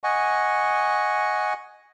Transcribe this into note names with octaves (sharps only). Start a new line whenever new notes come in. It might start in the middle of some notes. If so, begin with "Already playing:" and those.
D#5 F#5 G#5 C#6